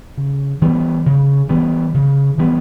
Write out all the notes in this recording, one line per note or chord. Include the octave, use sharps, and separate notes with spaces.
C#3
E3 G3 B3
C#3
E3 G3 B3
C#3
E3 G3 B3